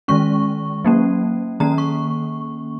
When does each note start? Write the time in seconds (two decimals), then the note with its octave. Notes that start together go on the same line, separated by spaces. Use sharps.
0.08 D#3 G#3 C#4 C#6
0.85 F#3 A#3 C#4
1.60 D#3 A#3 C#4 A#5
1.78 C#6